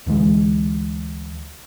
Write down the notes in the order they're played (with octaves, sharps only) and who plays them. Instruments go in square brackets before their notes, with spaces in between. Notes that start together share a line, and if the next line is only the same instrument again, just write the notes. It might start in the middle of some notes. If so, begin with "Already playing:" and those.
[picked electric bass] D2 E3 G#3